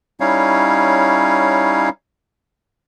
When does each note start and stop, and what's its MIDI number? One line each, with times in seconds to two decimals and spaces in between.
0.20 1.89 55
0.20 1.89 61
0.20 1.89 63
0.20 1.89 64
0.20 1.89 73
0.20 1.89 77